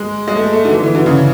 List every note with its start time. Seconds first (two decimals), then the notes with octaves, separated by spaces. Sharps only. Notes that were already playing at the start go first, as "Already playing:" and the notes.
Already playing: G#3
0.28 G#3
0.36 A3
0.53 A3
0.65 D3
0.71 E3
0.84 E3
0.95 D3
1.06 C#3